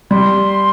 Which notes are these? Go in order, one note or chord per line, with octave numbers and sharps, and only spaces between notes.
G3 C6